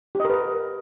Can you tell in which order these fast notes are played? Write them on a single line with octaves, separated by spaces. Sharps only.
G4 D#5 A#4 B4